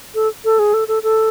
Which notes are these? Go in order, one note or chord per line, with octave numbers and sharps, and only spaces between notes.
A4
A4
G#4
A4
A4
A4